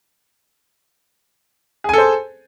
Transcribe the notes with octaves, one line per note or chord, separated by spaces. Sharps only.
G#4 A4 C5 G#5